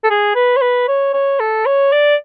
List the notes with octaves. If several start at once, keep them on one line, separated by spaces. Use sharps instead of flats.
A4
G#4
B4
C#5
B4
C#5
C#5
A4
C#5
D5